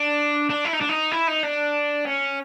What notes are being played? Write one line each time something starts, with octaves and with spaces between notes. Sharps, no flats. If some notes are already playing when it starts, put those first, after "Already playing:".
Already playing: D4
D4
E4
D#4
D4
D#4
E4
D#4
D4
C#4